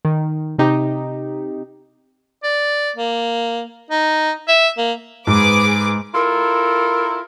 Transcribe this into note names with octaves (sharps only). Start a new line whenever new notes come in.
D#3
C3 D#4 G4
D5
A#3
D#4
E5
A#3
G#2 G#4 B4 D6
E4 F4 A4 A#4